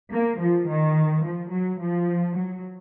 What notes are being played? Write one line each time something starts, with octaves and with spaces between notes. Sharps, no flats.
A#3
F3
D#3
F3
F#3
F3
F#3